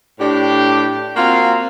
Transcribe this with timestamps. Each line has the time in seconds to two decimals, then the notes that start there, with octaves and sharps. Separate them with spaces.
0.20 A2 D4 G4
1.16 A#3 C4 F4 F#4 F5